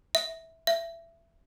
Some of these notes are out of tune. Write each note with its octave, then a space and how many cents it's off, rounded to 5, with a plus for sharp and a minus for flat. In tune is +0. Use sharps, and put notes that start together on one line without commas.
E5 -10
E5 +20